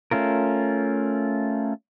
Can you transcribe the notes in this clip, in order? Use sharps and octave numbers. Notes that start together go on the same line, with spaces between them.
A3 C#4 F4 A#4